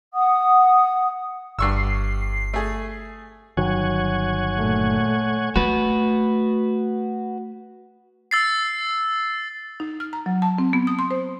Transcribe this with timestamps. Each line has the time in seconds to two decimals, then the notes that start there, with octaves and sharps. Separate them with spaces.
0.14 F#5 D#6
1.59 G1 G2 C#6 E6 C7
2.54 A3 G#4
3.57 G1 D#3 F#3 C#5 F#5 G#5
4.57 A#2 A3
5.56 A3 F#4 B4
8.31 E6 A6 C7
9.80 D#4
10.00 F6
10.13 A#5
10.26 F#3
10.42 A5
10.58 C4
10.73 B3
10.87 D#6
10.99 C6
11.11 C5